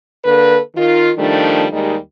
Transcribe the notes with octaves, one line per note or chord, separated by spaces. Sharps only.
D3 A#3 A4 B4
D#3 F4
D#3 F3 G3 A3 D4
D#2 D#3 G3 G#3 D#4